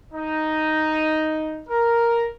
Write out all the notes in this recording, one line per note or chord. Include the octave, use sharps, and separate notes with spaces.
D#4
A#4